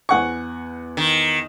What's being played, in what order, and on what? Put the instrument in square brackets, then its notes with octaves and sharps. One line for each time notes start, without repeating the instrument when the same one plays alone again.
[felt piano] E2 G#5 [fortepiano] F#5 C#6
[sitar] D#3